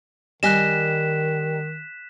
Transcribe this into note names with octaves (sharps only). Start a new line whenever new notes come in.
D#3 G3 D#5 G#5 F#6 B6 E7